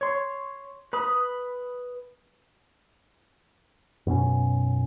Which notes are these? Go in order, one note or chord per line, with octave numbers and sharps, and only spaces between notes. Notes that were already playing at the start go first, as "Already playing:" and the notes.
C#5 C6
B4 B5 D#6
F#2 B2 C4 C#4